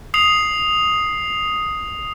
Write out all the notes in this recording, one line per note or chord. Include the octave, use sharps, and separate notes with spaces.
D#6 C7 F7